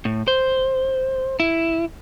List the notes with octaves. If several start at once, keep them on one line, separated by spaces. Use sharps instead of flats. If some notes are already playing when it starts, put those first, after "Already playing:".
A2
C5
E4